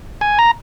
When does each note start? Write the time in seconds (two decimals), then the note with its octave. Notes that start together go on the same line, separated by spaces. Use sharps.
0.21 G#5
0.39 A#5